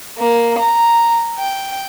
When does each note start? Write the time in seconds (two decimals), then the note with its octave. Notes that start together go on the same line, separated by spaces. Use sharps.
0.18 A#3
0.59 A#5
1.38 G5